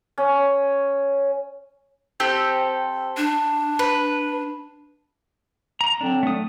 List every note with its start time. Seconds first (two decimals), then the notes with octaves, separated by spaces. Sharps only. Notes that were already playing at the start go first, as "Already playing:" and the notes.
0.18 C#4
2.20 C4 G4 A4
3.17 D4
3.79 B4
5.81 A#5
6.01 D3 F#3 C4 D4
6.23 A3 D#6